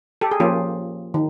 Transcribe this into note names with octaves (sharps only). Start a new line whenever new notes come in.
G4 A4
G#4
F3 A#3 C#4 F4 G4
D#3